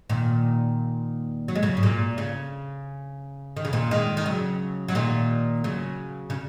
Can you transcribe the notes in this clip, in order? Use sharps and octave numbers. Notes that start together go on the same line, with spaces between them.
A#2 D#3
F#3
G#3
C#3 F#3
G#2
A#2
C#3
D#3
C#3
A#2 D#3
D#3 G#3
D#3
C#3 F#3
F#3
A#2 D#3
C#3 F#3
C#3